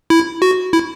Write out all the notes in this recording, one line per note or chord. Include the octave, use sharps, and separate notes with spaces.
E4
F#4
E4